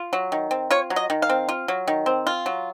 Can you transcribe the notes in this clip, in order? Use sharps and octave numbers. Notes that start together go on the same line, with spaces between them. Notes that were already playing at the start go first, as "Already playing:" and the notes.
Already playing: F4
F#3
D#3
C4
F4 C#5
F#3
D#5
D#3
F5
C4
F4
F#3
D#3
C4
F4
F#3